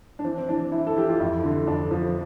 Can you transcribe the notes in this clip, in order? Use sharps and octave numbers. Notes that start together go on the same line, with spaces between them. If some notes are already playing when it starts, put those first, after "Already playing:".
D4
E3 C4
C4
E3 D4
E3 E4
A4
E3 G4
F4
F2 E4
D3
F2 D4
F3